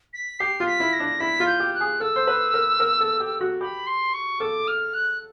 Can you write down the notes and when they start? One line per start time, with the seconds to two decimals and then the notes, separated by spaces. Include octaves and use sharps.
0.14 B6
0.40 G4 C7
0.60 F4
0.67 B6
0.80 E4
0.93 A#6
1.00 D4
1.20 E4 B6
1.40 F4
1.47 G6
1.60 G4
1.74 F#6
1.81 G#4
2.00 A4 E6
2.16 C5
2.27 B4
2.54 A#4
2.80 A#4
3.01 A4
3.20 G4
3.41 F#4
3.61 G4 B5
3.87 C6
4.14 C#6
4.40 A4 D6
4.68 F6
4.94 F#6